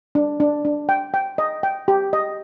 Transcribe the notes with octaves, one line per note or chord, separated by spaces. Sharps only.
D4
D4
D4
G5
G5
D#5
G5
G4
D#5